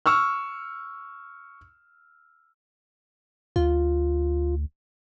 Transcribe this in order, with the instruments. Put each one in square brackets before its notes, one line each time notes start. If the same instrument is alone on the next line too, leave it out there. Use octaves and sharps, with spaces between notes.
[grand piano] C#6 E6 F6
[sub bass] D2 [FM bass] F4